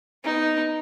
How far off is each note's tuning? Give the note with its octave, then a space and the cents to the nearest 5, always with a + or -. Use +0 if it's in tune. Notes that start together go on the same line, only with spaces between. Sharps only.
B3 +0 D#4 +0